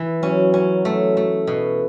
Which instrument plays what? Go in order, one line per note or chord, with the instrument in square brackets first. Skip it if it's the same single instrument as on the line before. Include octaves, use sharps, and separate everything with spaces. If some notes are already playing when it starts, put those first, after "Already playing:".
Already playing: [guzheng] E3
[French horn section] F#3 [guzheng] C#4
[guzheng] C#4
A3
A3
B2